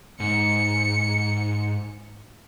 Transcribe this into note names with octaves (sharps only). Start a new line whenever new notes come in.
G#2 C#7